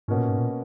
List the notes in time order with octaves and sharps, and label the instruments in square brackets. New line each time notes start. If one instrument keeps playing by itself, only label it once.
[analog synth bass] G#2 [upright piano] B2 A#3 C#4
[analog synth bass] A#2
G#2
A#2